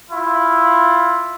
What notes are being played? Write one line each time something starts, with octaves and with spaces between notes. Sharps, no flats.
E4 F4